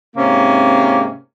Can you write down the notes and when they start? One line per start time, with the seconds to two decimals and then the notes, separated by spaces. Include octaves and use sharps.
0.16 G#2 C3 A#3 C#4